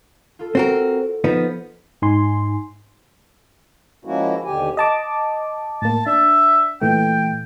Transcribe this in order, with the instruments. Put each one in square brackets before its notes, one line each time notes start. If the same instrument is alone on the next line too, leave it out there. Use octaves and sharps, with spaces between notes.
[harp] F4 A4
[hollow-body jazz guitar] C4 F#4 A#4
F3 B3 D#4
[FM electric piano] G#2 D#4 G#5 C6
[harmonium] F3 G#3 A#3 C#4 E4 F#4
D#2 B2 D3 G4 G#5
[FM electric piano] D#5 A5 D6
[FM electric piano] A2 A#3 [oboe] A5
[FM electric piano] D4 [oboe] E5
[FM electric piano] A#2 E3 A3 [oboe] G5